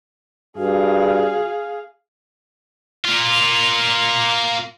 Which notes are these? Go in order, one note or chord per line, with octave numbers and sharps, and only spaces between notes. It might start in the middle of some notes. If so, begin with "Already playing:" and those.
G2 F#4 G#4 F5
A#3 F4